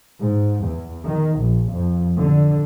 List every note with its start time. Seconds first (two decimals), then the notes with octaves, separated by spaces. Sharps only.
0.20 G#2
0.63 E2
1.07 D#3
1.39 A#1
1.73 F2
2.17 D3